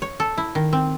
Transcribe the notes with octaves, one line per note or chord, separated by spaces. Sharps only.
C#5
A4
E4
D#3
C4